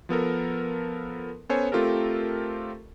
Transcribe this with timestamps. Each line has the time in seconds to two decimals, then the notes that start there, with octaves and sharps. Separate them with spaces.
0.09 F3 B3 A4 A#4
1.49 B3 C#4 A4 C5 C#5 G#5
1.72 A3 C4 F4 G4 A4 A#4